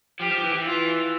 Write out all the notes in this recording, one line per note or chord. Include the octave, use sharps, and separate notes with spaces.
F3 G4
F3
E3
E3
F4